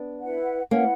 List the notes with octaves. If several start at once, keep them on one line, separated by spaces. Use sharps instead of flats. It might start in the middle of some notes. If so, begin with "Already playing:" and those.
Already playing: B3 D4
E4 B4 F#5
A#3 C#4 E4 B4 F#5